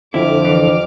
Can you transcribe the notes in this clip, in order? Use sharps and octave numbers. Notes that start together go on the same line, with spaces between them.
F2 D3 F3 E4 D6 F6
E3